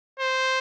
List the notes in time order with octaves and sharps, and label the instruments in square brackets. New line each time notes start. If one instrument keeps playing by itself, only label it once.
[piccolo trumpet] C5